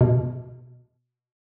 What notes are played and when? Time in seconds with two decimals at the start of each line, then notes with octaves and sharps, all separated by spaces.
0.01 B2